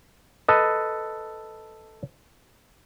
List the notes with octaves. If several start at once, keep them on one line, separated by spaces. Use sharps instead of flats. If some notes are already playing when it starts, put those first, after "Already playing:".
A4 B4 D#5